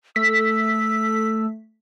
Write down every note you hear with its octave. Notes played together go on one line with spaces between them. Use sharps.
A3 E6 B6